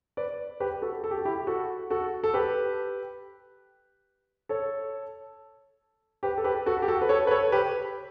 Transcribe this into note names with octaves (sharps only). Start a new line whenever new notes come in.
B4 D5
G4 B4
F#4 A4
A4
G4
F#4
E4 G4
F#4 A4
F#4 A4
A4
G4 B4
A4 C#5
G4 B4
A4
G4 B4
F#4 A4
G4
F#4 A4
B4
A4 C#5
B4
A4 C#5
G4 B4